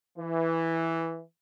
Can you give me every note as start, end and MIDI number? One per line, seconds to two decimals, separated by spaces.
0.18 1.21 52